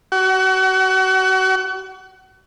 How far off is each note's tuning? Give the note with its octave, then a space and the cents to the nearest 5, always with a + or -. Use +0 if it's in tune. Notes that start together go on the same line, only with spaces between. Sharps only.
F#4 +30